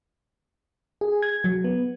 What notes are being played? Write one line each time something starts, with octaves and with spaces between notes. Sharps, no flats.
G#4
G#6
F#3
B3